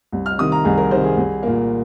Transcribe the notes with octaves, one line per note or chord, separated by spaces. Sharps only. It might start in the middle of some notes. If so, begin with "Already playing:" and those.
C2
F6
C3 D#3 D#6
A#5
C2 G#4
A#4
C3 D#3 C5
G#4
C2
A#2 A#3